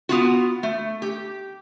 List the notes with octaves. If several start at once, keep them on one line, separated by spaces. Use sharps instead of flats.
B3 F4 F#4
A3
G4